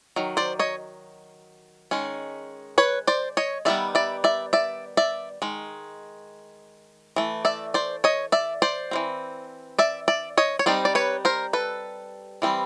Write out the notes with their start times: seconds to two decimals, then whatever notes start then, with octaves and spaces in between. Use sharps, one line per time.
0.16 D#3 F#3
0.37 C5 D5
0.59 C#5 D#5
1.91 D#3 G#3 C#4
2.78 B4 C#5
3.07 C5 D5
3.37 C#5 D#5
3.65 D#3 G3 B3 D5 E5
3.95 D5 E5
4.24 D5 E5
4.53 D5 E5
4.97 D5 E5
5.42 D#3 G#3
7.16 E3 A3
7.45 D5 E5
7.74 C5 D5
8.04 C#5 D#5
8.32 D5 E5
8.62 C5 D5
8.91 E3 G3 C4
9.79 D5 E5
10.08 D5 E5
10.38 C#5 D#5
10.59 C#5
10.66 G3 C4 D#4 C5 D5
10.85 D5
10.95 B4 C#5
11.25 A#4 C5
11.53 A4 B4
12.42 E3 G3 C4